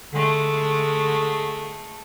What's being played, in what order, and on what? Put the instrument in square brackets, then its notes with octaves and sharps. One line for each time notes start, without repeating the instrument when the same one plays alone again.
[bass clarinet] D3 [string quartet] G#3 A3